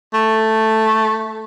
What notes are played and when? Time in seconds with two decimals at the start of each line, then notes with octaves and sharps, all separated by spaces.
0.14 A3